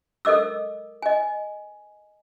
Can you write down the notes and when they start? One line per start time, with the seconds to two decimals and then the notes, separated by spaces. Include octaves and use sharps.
0.25 A4 A#4 D#5 D6 E6
1.02 D#5 G#5